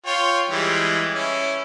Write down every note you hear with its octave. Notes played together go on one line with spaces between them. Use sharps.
F4 C#5 G5
E3 G3 G#3
C#4 E4